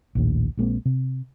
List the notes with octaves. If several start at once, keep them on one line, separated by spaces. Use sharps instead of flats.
A#1 D#2 A2
A#1 G#3 A#3 C4
C3